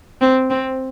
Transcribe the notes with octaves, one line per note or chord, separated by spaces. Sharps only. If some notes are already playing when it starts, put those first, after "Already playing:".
C4
C4